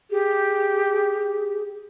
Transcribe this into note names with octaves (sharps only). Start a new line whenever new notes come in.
G4 G#4